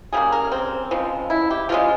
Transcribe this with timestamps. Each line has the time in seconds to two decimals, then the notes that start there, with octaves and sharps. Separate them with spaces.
0.13 C#3 G3 A#3 G#4
0.32 A#4
0.52 C4
0.91 C#3 F3 G#3
1.30 E4
1.50 G4
1.69 C#3 F3 G#3 F4